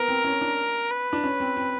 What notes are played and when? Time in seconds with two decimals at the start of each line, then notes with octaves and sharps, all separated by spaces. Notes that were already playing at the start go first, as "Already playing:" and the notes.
Already playing: B3 A#4
0.08 C4
0.24 C#4
0.41 D4
0.90 B4
1.13 D4
1.24 C#4
1.40 C4
1.56 C4